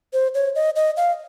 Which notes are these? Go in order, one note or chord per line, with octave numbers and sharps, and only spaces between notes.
C5
C#5
D#5
D#5
F5